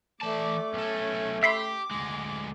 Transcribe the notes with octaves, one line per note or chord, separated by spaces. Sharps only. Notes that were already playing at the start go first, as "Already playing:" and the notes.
E3 A3 D5 A5 D6
B1 C#4 A4
G4 E5 B5 C6 D6
D2 G#3